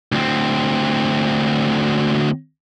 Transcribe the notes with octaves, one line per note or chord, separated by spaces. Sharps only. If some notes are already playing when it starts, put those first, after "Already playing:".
D2 C4